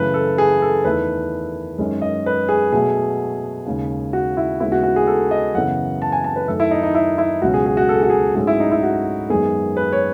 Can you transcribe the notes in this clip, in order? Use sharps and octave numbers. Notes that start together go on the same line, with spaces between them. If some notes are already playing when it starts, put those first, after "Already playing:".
Already playing: F#2 C#3 E3 A3 B4
A4
G#4
A4
E2 D#3 A3 B4
F#2 D#3 G#3 C#4
D#5
B4
G#4
B2 F#3 A3 G#4
D#2 C#3 G#3
F#4
E4
D#2 C#3 G#3 B3 E4
F#4
F#4
G#4
A4
D#5
F#2 C#3 E3 B3 F#5
A5
G#5
A5
B4
F#2 D#3 A3 A4
E4
D#4
D#4
E4
E4
C#2 B2 F#3 C#4 F#4
G#4
G#4
F#4
A4
G#4
F#4
G#4
G#2 F#3 A3 C#4 G#4
E4
D#4
E4
F#4
F#2 D#3 G#3 B3 G#4
B4
C#5